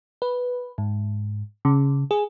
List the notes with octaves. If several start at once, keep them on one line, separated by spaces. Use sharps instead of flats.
B4
G#2
C#3
G#4